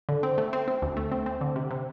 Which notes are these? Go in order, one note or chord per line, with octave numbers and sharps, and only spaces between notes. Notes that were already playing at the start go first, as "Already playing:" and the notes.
D3
C4
A3
C4
C4
D2
A3
C4
C4
D3
C3
C3